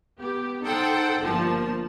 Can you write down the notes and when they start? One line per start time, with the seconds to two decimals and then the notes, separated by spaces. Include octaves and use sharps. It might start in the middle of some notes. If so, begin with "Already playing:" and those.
0.17 B3 G4
0.63 D#4 A4 C5 F#5 G5
1.22 G1 F3 A#3 A5